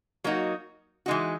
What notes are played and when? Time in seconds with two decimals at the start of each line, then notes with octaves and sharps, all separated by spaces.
0.24 F#3 A#3 D#4 F#4
1.06 E3 G#3 D#4 F#4